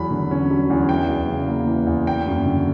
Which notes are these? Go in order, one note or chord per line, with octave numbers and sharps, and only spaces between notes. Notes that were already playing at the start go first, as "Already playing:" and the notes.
Already playing: E2 F#3 B5
D3
C#4
F#3
E2
E3 G5
E2
C#3
A#3
E3
E2
A#3 G5
F#2
D3